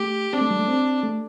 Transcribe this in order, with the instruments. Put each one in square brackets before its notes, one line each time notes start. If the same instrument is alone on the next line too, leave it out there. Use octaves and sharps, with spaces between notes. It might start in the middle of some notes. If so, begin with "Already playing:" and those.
Already playing: [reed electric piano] A3 [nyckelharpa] G4
[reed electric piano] C4 [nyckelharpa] D4
[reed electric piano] A3
G3
A3
C4
A3